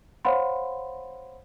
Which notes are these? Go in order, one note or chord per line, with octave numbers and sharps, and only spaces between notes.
C5 C#5 F5 F#5 B5 C6